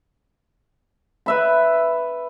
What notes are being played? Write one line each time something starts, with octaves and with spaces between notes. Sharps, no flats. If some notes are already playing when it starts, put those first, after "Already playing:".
B4 E5 B5